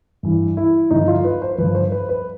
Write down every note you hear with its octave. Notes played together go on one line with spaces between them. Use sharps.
G2 E3 G3
E4
G2 D3 F3 D#4
F4
B4
C5
G2 D3 F3 B4
C5
B4
B4